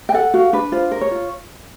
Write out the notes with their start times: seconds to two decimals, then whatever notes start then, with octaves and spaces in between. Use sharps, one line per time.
0.09 G5
0.14 A4 F#5
0.34 F#4 F5
0.53 D4 B4
0.72 F4 C5
0.91 A#4
1.01 C#5
1.11 F4